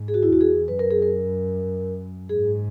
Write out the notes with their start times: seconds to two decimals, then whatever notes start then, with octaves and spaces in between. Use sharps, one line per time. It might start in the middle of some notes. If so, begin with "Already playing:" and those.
Already playing: G#2
0.08 G#4
0.14 F#4
0.23 E4
0.28 E2 F#4
0.41 G#4
0.68 F#2 B4
0.79 A#4
0.90 G#4
1.02 A#4
2.30 G#2 G#4